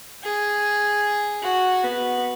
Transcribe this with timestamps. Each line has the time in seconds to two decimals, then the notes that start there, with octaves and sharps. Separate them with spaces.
0.24 G#4
1.43 F#4
1.83 B3